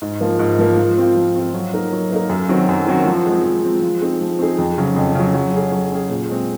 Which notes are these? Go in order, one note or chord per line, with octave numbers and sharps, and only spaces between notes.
G#2
F3 A#3
G#2
F3 A#3
F3
C4 F4
F3
C4 F4
F#3
A#3 D#4 A#4
F#3
A#3 D#4 A#4
F#2
D#3 F#3 C4 F#4
F#2
D#3 F#3 C4 F#4
F3
G#3 C4
F3
G#3 C4
F3
C4 D#4 G#4
F3
C4 D#4 G#4
F2
C#3 F#3
F2
C#3 F#3
F#3
C#4 G#4
F#3
C#4 G#4
A#2
G#3 C4